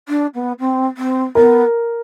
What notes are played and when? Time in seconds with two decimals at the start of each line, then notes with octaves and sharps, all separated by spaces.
0.09 D4
0.34 B3
0.59 C4
0.97 C4
1.35 B3 A#4